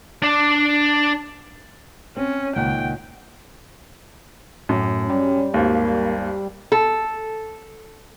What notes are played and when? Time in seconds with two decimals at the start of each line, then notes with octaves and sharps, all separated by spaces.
0.22 D4 D5
2.17 C4 C#4
2.56 C#2 A#2 D#3 F#5 G5
4.69 F#2 A2
5.09 G3 C#4
5.54 G#1 D#2 A#3
6.72 A4